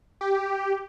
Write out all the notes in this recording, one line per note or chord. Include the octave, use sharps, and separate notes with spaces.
G4